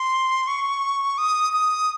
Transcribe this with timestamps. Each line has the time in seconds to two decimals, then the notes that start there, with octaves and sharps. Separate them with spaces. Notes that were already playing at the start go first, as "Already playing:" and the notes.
Already playing: C6
0.47 C#6
1.18 D#6
1.53 D#6